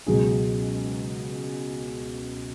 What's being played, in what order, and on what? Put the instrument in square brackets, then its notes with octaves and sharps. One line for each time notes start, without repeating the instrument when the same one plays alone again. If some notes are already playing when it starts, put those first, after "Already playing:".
[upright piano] C#2 B2 F#3 G#4